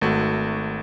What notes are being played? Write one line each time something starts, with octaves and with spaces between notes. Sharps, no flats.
G#1 A3 F#4